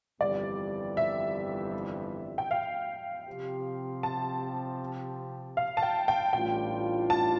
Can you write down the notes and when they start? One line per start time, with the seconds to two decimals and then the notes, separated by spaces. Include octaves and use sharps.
0.21 G1 F2 E3 G3 D5
0.97 E5
2.38 G5
2.51 F5
3.27 C3 F3 C4 G4
4.03 A5
5.57 F5
5.77 A5
5.82 G5
6.08 G5
6.33 A1 A2 G3 D4 F4 G5
7.10 A5